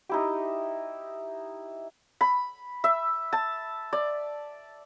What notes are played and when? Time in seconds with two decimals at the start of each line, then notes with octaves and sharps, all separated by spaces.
0.09 D#4 E4 G4
2.21 B5
2.84 E5
3.33 A5
3.93 D5